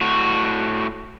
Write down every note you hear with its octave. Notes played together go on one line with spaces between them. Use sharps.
A2 F#4